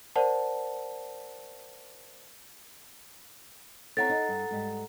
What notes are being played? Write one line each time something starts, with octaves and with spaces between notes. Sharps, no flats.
A#4 C5 D5 F#5 A5
C4 E4 A4 C#5 F#5 A#5 A6
D#4
G2
G#2 G3